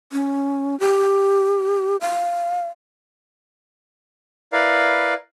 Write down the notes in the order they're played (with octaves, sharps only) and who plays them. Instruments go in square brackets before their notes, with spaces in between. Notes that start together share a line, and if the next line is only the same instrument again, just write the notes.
[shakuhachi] C#4
G4
F5
[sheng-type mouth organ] E4 A#4 B4 D5 F5